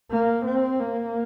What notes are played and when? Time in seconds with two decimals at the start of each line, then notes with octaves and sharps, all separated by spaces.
0.10 A#3
0.46 C4
0.80 A#3